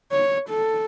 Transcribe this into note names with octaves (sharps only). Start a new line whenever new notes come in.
C#5
A4